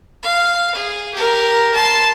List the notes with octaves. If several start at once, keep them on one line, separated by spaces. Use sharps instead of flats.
F5
G#4
G4 A#4
A5 C6